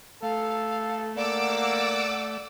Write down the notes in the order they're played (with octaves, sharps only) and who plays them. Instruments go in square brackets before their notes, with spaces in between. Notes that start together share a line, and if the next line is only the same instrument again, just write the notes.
[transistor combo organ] A3 [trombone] A4 [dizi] F5
[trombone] A#3 [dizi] D5 [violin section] F#5 D6 E6